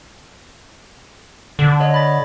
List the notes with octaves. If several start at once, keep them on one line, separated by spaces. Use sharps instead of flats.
D3
C#5 D#5
B5 A6